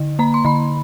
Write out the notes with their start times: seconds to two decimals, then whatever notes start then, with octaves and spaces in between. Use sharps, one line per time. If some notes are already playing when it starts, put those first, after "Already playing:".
Already playing: D3
0.19 A#3 A#5
0.34 C6
0.45 D3 B5